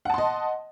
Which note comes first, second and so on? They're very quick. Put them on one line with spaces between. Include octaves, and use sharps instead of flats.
F#5 A5 C6 D#5